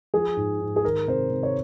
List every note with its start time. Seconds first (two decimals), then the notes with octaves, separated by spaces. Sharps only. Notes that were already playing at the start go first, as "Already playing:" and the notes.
0.14 F3 G#4
0.37 G#2
0.61 G#2
0.76 G#4
0.84 D#3 A#4
1.08 C3 C5
1.31 C3
1.43 C#5